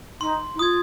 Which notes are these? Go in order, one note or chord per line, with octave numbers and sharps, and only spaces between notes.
D#4 C6
D#4
F4 D#6 G#6